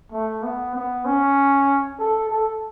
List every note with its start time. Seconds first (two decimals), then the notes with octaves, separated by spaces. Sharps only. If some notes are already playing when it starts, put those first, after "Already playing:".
0.12 A3
0.43 B3
0.75 B3
1.05 C#4
1.99 A4
2.29 A4